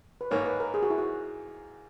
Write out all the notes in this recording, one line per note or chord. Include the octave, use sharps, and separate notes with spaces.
B4
G#2 D#3 A#3 C#5
B4
A#4
G#4
F#4
E4
F#4